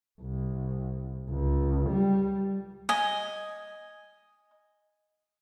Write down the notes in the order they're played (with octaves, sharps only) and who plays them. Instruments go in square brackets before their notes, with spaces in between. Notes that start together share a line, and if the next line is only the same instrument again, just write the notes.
[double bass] C2
C#2
G3
[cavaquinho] D#5 G#5